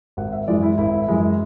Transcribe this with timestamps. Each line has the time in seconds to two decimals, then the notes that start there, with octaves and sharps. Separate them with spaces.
0.17 G#1 F#5
0.33 E5
0.48 F#2 E3 G#3 D5
0.63 E4
0.78 G#1 E4
1.08 F#2 E3 G#3